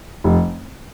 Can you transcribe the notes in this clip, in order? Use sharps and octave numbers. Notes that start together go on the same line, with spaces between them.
F1